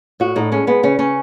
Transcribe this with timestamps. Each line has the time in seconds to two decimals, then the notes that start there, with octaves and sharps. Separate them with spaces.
0.20 A2 F#4
0.36 A2 D#4
0.52 G#3 C#4
0.67 G#3 B3
0.83 C#3 C#4
0.99 C#3 C#4